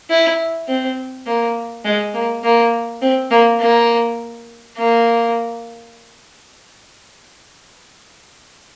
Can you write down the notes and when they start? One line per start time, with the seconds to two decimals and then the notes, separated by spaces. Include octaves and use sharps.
0.10 E4
0.69 C4
1.27 A#3
1.85 G#3
2.14 A#3
2.44 A#3
3.02 C4
3.31 A#3
3.61 A#3
4.77 A#3